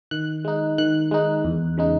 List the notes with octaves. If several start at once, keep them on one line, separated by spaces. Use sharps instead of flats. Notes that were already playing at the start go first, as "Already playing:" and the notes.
D#3 F#6
G#3 D#4
D#3 F#6
G#3 D#4
E2
C#3 G#3 D#4